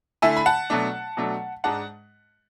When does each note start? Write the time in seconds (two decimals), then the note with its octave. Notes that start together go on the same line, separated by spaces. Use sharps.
0.22 D3 A3 E4 E5 G#5
0.37 B5
0.46 F#5 A5
0.70 B2 F#3 A3 D4
1.17 B2 F#3 A3 D4
1.64 G#2 G#3 D4 F#5 A5